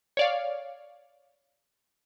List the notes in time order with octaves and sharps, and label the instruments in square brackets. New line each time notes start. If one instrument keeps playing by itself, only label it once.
[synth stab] C#5 D5 F5